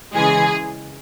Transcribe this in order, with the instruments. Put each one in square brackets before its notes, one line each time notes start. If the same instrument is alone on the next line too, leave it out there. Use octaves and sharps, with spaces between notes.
[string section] C#3 E3 G#3 G#4